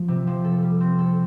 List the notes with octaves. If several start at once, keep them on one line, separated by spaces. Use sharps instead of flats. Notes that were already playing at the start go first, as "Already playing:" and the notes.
Already playing: F3
C3
F3
A4
G3
C4
A4